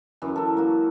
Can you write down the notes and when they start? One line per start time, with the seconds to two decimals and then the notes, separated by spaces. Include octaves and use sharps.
0.22 F#2 E3
0.36 A4 A#4
0.57 A#3 F#4